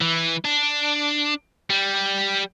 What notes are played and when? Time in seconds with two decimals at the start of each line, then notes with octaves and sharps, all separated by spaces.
0.01 E3
0.45 D4
1.70 G3